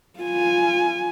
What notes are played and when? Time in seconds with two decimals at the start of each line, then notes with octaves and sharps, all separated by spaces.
0.19 F4 G#5